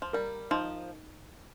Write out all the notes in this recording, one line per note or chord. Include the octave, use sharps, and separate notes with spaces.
F3
G3 A#4
F3 D#4